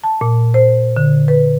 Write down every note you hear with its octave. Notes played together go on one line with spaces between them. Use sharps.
A5
A#2
C5
D3
B4